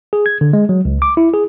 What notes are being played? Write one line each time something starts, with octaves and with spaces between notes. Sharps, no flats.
G#4
G#6
D3
G#3
F#3
C#2
D6
E4
G#4